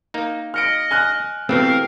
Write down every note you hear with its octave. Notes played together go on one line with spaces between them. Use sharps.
A#3 D#4
D#5 F6 C#7 D7
G#5 F6 F#6
B2 E3 A3 C4 G4 A#4 B4 F5